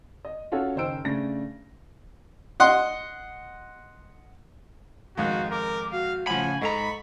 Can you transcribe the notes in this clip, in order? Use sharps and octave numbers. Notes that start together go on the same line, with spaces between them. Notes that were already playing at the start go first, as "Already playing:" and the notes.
D#5
C#4 F4 F#4 A4 C#5 F#5
F#1 D#3 C5 G5 E6 D7
C#3 A3 D4 A#6
D#5 F#5 C6
F2 G#2 D#3 F#4 F5
A#4 D6
F#4 F5
A2 C#3 F3 F#5 G#5 B5
G#2 A4 D#5 A#5 B5 C#6